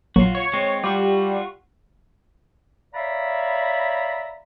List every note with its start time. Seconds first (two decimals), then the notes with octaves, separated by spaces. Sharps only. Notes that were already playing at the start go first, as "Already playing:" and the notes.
0.16 A#1 F#3 A#3 F4 F#4
0.35 C#5
0.53 G#3 C4
0.84 G3 F4 F#4
2.95 C#5 D5 E5 F5 A#5 B5